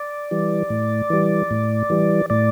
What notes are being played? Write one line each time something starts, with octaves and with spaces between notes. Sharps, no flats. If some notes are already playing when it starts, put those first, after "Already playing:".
Already playing: D5
E3 G3
A2
E3 G3
A2
E3 G3
A2 D5